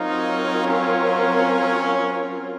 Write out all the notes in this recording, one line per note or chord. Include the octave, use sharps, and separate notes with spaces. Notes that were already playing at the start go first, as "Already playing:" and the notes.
Already playing: F#3 C4 D#4 F4 A#4 C#5
C#4